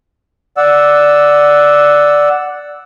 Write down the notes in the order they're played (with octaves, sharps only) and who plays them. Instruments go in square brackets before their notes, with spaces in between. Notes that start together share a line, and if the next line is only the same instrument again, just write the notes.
[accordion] D5 F#5 E6